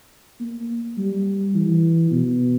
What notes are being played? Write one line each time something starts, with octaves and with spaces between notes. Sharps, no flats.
A#3
G3
E3
B2